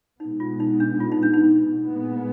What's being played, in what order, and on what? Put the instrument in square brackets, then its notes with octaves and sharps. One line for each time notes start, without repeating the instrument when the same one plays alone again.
[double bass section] B2 G#3 B3 [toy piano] D#4
[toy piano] F4
D#4
D4
F4
D#4
D4
D#4
[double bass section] A#2 G#3 B3